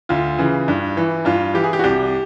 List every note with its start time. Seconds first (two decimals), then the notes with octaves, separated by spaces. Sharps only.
0.09 D2 F4
0.39 C#3 E3
0.68 G2
0.97 E3
1.25 G2 F4
1.54 E3 G4
1.64 G#4
1.73 G4
1.79 F#4
1.84 C2 G4